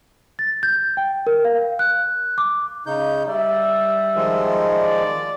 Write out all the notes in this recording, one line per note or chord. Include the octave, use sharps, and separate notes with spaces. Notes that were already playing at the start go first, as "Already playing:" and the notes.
A6
G6
G5
A#4
F5
F#6
D6
C#3 D#4 G6
G3 D5 E5
D#3 F3 G#3
D5